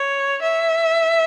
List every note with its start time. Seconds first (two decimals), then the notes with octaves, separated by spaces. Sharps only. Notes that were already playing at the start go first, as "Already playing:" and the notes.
Already playing: C#5
0.42 E5